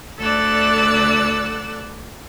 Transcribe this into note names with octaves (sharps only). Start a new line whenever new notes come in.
D2 A4 D5 E6 F#6